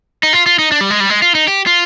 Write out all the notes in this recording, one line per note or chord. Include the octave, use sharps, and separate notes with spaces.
D#4
F4
F4
D#4
D4
G3
G#3
G3
G#3
F4
D#4
G4
F4